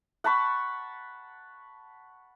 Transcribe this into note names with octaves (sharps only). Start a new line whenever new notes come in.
F#5 A5 B5 C#6